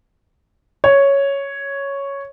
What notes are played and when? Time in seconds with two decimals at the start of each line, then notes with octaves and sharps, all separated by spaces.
0.84 C#5